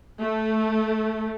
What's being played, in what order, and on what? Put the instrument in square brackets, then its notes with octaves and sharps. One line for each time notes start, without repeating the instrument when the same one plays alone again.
[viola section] A3